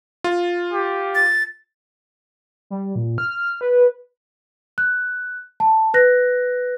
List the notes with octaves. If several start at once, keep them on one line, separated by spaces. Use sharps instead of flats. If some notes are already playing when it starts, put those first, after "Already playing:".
F4
G4
A6
G3
A#2
F6
B4
F#6
A5
B4 F#6 A#6